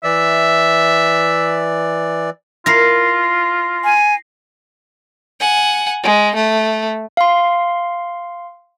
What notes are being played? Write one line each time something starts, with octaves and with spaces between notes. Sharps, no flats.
E3 D5 E5
E4 F4 A#4 A#6 C7
G#5
F#5 G#5
G#3
A3
F5 C6